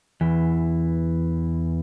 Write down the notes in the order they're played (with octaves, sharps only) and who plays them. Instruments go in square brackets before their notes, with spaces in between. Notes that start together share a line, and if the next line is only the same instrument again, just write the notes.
[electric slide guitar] E2 E3